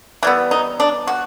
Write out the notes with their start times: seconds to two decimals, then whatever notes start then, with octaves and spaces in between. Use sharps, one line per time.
0.23 E3 G3 B3 E4
0.51 D#4
0.80 D4
1.07 F#4